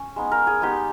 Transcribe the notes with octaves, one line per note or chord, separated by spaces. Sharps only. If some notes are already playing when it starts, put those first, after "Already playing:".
Already playing: C#4
G#3 B3 D#4
A#4
G#4
G#3 B3 D#4 G4